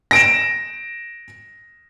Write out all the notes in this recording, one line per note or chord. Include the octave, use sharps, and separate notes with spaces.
A#6 D7 E7